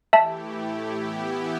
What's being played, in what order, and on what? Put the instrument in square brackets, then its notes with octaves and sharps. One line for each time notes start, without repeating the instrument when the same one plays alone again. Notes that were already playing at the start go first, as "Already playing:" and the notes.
[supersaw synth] E3 A3 E4 G4 [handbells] E5 A5
[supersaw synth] A2 A3 E4 G4
E3 B3 E4 G4